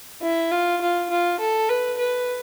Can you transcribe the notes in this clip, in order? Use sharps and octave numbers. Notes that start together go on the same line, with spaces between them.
E4
F4
F4
F4
A4
B4
B4